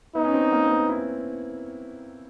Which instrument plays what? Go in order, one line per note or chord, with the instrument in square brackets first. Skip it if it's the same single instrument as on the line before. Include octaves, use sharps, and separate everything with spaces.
[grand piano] B3 [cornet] D#4
[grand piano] C#4
C4
A#3
C4
B3
E4